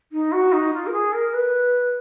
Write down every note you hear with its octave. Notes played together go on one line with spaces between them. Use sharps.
D#4
F#4
D#4
F4
A#4
G#4
A#4
B4